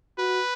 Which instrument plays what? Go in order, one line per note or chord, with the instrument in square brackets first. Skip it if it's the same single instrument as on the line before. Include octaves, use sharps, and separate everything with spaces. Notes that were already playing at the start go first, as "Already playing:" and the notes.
[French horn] F#4 [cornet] B4